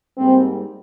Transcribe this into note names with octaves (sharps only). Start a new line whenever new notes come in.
G#2 G3 A#3 C4